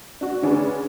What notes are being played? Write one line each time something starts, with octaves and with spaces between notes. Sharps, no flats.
D4 F#4
D3 C#4 D4 G#4 B4